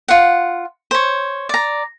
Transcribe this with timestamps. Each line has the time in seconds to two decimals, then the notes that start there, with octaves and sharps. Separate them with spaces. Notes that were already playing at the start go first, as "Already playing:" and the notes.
0.08 F4 F#5
0.91 C5 C#5
1.49 D5 A#5